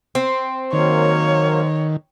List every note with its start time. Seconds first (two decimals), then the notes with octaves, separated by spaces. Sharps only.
0.15 C4
0.73 D#3 F#3 A#3 C#5